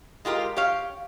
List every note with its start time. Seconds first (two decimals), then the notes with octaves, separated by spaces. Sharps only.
0.25 G#3 F4 G4 A#4
0.57 G4 C#5 F5